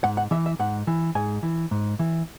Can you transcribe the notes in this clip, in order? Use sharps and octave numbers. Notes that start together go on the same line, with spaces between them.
G#2 F#5
F#5
E3 E5
E5
G#2 F#5
E3
G#2 G#5
E3
G#2
E3